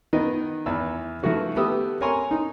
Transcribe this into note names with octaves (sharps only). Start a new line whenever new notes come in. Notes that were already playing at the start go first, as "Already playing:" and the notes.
D#3 B3 D#5
E2 E3 B5 E6
D#3 F3 A3 E4 F#4 B4
A3 B3 G4 D#6 E6
A#4 C#5 G#5 A#5 C6 C#6
D#4